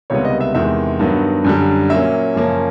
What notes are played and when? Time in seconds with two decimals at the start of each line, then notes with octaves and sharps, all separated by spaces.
0.10 C#2 C3 D#3 G3 B3 C#5
0.25 D#5
0.41 E5
0.55 E2 C3 D#3 G#3 E5
0.99 G2 D#3 F#3 B3
1.44 F#2 D3 G3
1.90 A#2 F#3 A#3 C#4 E5
2.35 F#2 C#3 F3 A#3 C#4